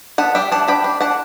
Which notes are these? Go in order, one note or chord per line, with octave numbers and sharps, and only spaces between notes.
B3 F#5 A5
G3 E5 G5
D4 F#5 A5
D4 G5 B5
D4
D4 F#5 A5